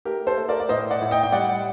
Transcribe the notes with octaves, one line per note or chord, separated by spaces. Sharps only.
A3 G4 A#4
A4 C5
A3
A#4 D5
D5
A2 C5 D#5
D5 F#5
A2
D#5 G5
G5
G3 D5 F#5